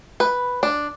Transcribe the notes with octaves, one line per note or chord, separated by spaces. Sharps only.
B4
D4